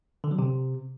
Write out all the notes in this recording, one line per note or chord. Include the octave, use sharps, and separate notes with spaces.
D3
F#3
C3